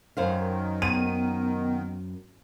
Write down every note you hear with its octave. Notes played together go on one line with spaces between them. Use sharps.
F#2 D#3 C5 F5
B3 D#7